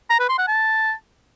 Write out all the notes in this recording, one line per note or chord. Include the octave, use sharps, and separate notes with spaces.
A#5
B4
C6
F#5
A5